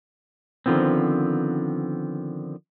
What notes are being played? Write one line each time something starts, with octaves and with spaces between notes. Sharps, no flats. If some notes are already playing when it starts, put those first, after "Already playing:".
D3 D#3 F3 B3 C4